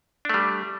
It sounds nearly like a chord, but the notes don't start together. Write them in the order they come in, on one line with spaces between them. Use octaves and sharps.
D4 A3 G3